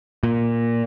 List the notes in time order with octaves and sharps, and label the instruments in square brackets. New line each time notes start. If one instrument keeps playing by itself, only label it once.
[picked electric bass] A#2